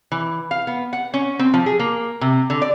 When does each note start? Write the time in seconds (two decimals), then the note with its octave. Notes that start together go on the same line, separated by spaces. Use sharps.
0.12 E3
0.51 F5
0.67 B3
0.93 F#5
1.14 C#4
1.39 C4
1.54 F3
1.66 G#4
1.79 A#3
2.21 C3
2.50 D3
2.62 D5